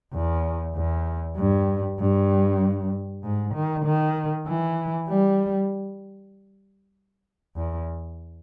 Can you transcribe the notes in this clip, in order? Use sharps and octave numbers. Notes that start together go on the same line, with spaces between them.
E2
E2
G2
G2
G#2
D#3
D#3
E3
G3
E2